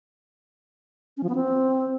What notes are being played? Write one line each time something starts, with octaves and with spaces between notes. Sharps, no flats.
C#4
F3
B3
C4